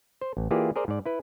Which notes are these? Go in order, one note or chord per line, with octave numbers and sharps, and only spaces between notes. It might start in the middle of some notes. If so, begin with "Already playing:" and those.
C5
A1
E3 A#3 F4 G4 G#4 D5
G#4 A#4 C5 D5
G#2 D5
E4 B4